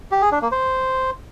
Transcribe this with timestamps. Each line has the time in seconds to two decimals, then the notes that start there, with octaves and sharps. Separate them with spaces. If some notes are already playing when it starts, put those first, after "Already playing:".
0.12 G4
0.22 G#4
0.32 D4
0.42 A#3
0.52 C5